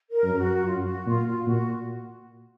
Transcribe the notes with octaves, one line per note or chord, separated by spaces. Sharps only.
A#4
F#2
F#4
F#2 F4
F#4
A#2 F4
F4
A#2 F#4